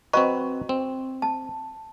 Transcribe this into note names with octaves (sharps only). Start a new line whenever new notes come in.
C4 F#4 B4 D#5 A#5 C#6
C4
A5